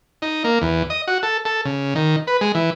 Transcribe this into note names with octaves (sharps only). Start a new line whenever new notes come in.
D#4
A#3
E2
D#5
F#4
A4
A4
C#3
D#3
B4
G#3
E3